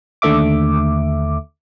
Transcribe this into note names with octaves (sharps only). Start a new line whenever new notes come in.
D#2 D3 A3 E5 D6